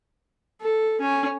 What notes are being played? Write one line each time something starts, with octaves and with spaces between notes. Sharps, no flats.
A4
C#4